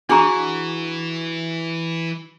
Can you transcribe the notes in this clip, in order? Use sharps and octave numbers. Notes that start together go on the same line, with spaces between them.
E3 D4 F#4 G#4 A#5